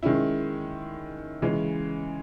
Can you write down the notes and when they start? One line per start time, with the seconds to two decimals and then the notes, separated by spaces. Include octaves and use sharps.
0.03 D#3 G#3 C#4 E4
1.42 C#3 E3 G#3 C#4